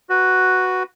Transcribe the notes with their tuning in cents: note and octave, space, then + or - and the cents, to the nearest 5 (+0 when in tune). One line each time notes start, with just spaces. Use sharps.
F#4 +0 B4 +0